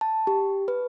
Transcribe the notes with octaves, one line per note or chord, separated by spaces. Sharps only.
A5
G4
B4